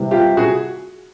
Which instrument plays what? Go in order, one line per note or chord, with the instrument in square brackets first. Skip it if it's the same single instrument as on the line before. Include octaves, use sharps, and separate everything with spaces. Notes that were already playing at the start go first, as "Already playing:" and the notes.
Already playing: [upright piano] C3 E3 G3
F4 G4
F#4 G#4